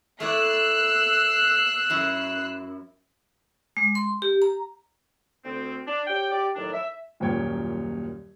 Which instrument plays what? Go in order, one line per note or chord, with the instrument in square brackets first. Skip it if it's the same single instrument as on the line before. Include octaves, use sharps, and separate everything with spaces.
[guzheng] A3 E4 D5 [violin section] E6 F#6 C7
[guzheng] F#2 E4 A#4
[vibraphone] G#3
C6
G4
A#5
[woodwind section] D2 C4
D4
G4 C#5 G5
G4 D5
A2 D#3 F#3 D4
E5
[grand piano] D#1 F#2 A#2 C#5 G5 G#6